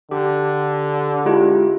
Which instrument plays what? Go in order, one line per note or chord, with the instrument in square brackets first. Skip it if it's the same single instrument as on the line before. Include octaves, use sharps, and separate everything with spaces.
[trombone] D3 [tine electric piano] G4
[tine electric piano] G#3 [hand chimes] E4 F4 G4